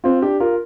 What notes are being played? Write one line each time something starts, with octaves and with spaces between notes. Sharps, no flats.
C4 F4
D4 G4
F4 A#4